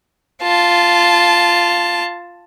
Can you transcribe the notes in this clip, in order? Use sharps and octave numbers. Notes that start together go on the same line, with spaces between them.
F4 A5